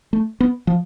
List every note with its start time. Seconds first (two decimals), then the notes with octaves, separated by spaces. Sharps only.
0.13 A3
0.40 B3
0.67 F3